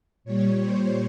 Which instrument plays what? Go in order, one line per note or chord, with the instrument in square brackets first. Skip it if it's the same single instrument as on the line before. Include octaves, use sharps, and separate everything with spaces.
[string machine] A#2 G3 C#5
C5